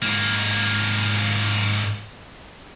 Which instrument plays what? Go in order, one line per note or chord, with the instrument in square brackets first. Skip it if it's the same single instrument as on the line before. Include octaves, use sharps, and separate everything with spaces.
[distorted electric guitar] G#2 A#3